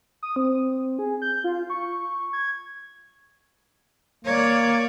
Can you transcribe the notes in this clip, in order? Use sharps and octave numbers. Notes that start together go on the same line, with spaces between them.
D#6
C4
G#4
G6
F4
C#6
G#6
A#3 C#5 D5